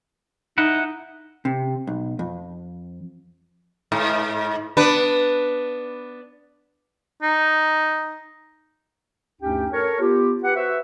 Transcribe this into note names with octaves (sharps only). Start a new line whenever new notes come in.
D#4 E4 F#5
C3
B1
F2
G#2
B3 D4 B4
D#4
D2 G2 C#4 D#4 G4 G5
A4 A#4 C#5
B3 F4 G4
G4 B4 F#5
F#4 B4 C5 E5